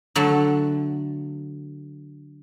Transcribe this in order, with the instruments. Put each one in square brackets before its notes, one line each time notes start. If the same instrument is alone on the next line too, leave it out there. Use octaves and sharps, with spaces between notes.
[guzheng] D3 F#3 A3 A4